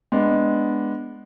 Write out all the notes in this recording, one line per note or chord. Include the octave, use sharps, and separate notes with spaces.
G#3 B3 D4